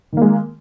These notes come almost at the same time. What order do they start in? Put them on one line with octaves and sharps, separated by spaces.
D#3 A#3 G#3